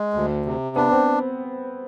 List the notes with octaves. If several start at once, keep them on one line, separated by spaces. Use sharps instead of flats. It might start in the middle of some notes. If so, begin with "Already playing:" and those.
Already playing: G#3
D2
C3
B3 D4
C4